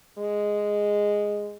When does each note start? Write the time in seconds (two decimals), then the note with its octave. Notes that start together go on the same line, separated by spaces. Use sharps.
0.18 G#3